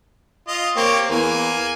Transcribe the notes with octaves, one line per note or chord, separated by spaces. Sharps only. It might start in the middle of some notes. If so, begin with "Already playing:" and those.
F4 D#5
A#3 C4 G4 C#5
E2 A#3 G#5